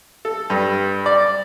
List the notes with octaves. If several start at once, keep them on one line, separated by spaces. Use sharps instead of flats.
A4
G2
D5